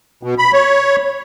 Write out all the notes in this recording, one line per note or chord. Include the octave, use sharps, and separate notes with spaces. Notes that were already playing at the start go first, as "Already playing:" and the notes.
B2
B5
C#5